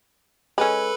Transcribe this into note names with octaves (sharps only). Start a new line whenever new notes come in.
G#3 C#4 A4 B4 B5